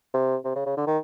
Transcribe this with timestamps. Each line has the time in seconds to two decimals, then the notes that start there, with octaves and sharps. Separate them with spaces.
0.14 C3
0.45 C3
0.55 C#3
0.66 C#3
0.77 D3
0.87 D#3